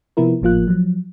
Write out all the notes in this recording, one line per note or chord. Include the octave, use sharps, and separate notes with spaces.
C3 F3 B3 E4 A#4
G#1 A2 F3 A#3 F4 F#6
F3 F#3